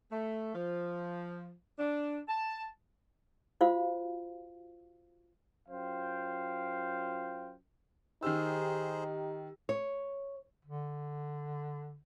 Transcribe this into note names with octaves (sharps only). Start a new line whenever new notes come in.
A3
F3
D4
A5
F4 F#4 C5 F5
F#2 F4 C5 F5 G5
D#3 D#4 G4 G#4 C5 G5 E6
C#5
D3